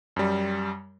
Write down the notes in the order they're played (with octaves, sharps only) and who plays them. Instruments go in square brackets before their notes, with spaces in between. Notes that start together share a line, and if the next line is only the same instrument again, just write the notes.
[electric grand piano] F#2 G3